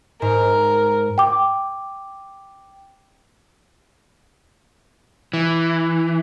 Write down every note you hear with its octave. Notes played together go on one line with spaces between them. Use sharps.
G#2 A#4
G5 D6
E3